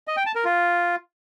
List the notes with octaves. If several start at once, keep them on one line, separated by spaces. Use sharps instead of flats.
D#5
G5
A5
A#4
F4